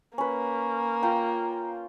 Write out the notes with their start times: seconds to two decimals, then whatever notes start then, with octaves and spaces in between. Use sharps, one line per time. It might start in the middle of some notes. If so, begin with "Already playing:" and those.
0.18 A#3 C#4 B4
1.02 F4 G5 A#5